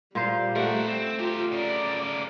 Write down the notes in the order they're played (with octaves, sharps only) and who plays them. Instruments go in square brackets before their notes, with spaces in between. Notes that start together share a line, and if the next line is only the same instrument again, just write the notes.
[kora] A#2 F4 C5 [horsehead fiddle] G3
[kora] A3 F#5 [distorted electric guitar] A#4 C5
[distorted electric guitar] C4
[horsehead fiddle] F4 [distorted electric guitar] G4 A#4
[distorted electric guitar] C#3 A#4 [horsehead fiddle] D5